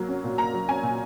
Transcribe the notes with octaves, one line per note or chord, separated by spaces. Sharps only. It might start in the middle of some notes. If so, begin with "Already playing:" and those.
Already playing: F#3 A#3
C#4
A#2
A#3 A#5
F#3
C#4 G#5
A#2